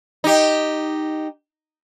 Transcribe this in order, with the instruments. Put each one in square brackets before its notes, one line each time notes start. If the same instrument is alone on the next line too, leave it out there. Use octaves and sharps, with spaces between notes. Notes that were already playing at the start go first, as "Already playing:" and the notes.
[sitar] D#4 G4